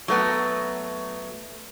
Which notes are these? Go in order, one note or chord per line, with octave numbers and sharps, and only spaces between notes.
F#3 A3 B3